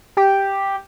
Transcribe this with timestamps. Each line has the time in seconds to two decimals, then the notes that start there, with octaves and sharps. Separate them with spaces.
0.17 G4